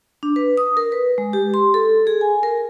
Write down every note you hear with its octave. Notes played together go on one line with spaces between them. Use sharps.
D4
B4
D#6
A#4
B4
G#3
G4
C6
A4
G#4
G#5
A#4